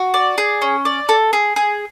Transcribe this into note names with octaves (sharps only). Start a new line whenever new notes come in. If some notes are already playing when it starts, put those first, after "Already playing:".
Already playing: F#4
D5
G#4
C#4
D5
A4
G#4
G#4